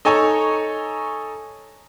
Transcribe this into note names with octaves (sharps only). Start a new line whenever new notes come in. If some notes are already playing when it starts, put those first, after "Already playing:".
D#4 A4 C#5 G#5 A#5 C#6